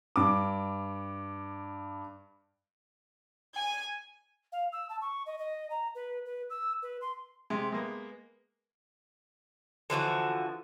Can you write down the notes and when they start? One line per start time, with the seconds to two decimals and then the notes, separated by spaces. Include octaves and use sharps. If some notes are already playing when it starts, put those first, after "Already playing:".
0.16 G2 D6
3.55 G#5
4.52 F5
4.73 E6
4.89 A5
5.01 C#6
5.26 D#5
5.39 D#5
5.70 A#5
5.95 B4
6.26 B4
6.50 E6
6.82 B4
7.01 C6
7.50 C3 G#3
7.72 G#3 A#3 B3
9.90 D3 E3 F3 F#4